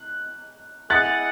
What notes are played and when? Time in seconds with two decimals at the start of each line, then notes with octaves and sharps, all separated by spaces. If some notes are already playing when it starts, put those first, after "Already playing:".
Already playing: F#6
0.90 E4 G#4 D#5 F#5 F#6 A6